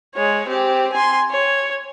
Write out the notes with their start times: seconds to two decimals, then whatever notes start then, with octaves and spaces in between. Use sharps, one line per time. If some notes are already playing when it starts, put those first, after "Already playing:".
0.15 G#3 C#5
0.48 C4 G4
0.93 G#5 C6
1.31 C#5